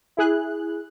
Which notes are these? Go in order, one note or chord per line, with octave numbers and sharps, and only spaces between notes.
E4 G#4 F#6